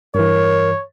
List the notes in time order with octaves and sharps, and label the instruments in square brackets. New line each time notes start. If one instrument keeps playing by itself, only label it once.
[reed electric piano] G2 E3 [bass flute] A#4 [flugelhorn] C#5